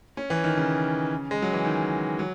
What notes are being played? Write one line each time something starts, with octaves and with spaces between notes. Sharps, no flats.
C#4
E3
D#3
C#3
G#3
F#3
E3
D#3
F#3